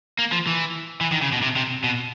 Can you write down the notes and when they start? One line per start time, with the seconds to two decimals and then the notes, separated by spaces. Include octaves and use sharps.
0.19 A#3
0.32 F3
0.47 E3
1.01 E3
1.12 D#3
1.22 C#3
1.33 B2
1.42 C3
1.56 C3
1.84 B2